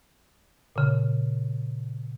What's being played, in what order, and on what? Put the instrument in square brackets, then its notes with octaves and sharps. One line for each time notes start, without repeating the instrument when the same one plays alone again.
[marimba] A#2 C#3